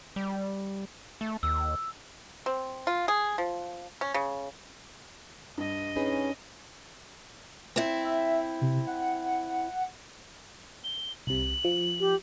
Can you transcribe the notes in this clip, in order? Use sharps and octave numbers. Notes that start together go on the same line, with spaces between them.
G3
A3
D#2 E6
C4
F4
G#4
F3
C#4
C#3
G2 D#5
C#4 D#4 G#4 B4
C4 E4
E5
C3
F#5
G7
C2 C3 F#7
F3
G4